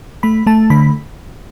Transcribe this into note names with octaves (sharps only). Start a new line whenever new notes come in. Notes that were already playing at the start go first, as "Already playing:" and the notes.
A3 B5
A3 A5
D3 B5